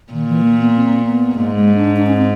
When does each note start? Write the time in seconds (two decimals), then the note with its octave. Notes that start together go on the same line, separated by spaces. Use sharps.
0.13 A#2 D#3
0.28 E3
0.43 A#3
0.59 B3
0.74 C4
1.05 B3
1.35 G#2 A#3
1.56 G#3
1.76 D4
1.96 D4
2.06 C#4
2.16 C4